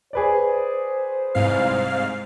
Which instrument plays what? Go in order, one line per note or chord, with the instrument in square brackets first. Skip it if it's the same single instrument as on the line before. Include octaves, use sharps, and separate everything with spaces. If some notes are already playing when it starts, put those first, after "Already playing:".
[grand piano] G#4 B4 D5 [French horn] C5
[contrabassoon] C2 [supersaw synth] G#2 F5